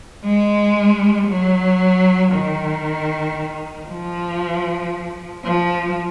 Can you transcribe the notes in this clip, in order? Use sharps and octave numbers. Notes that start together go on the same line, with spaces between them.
G#3
F#3
D#3
F3
F3